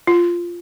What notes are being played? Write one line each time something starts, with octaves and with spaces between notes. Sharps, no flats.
F4